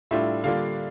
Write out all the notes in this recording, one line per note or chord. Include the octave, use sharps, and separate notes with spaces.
A2 G3 D4 F4 E5
D3 G3 A#3 D4 F4 F5